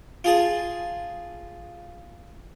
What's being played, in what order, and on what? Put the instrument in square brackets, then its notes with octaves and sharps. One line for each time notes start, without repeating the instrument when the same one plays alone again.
[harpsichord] F4 G#4 A5